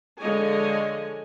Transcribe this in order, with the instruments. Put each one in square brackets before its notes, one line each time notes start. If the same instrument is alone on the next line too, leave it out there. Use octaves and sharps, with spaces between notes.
[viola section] D3 F3 G#3 C#5 D#5 G#5